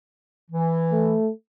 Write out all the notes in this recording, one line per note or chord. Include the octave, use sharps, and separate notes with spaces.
E3
A3